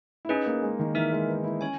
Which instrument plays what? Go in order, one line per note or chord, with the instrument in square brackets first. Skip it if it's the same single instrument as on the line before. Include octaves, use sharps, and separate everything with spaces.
[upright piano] E4
[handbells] C#4 G#4 B4 [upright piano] D#4
[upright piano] A#3
G#3
D#3
[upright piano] E3 [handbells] D#4 A#4 E5
[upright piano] G#3
B3
E4
[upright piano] C#4 [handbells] C#5 G#5